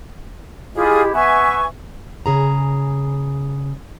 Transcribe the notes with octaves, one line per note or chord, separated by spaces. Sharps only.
G#3 E4 F4 G4 G#4
B3 B4 E5 G#5 C#6
C#3 G#4 A#5